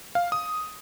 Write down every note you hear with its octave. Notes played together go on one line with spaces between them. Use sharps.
F5
D#6